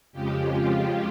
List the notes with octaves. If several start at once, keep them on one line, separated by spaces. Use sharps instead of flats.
F2 C#3 F3 G#3 G4
F4